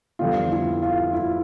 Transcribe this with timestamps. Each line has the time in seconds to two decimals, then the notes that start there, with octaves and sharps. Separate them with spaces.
0.19 F2 D3 G3 B3 F4
0.51 E4
0.82 F4
1.13 E4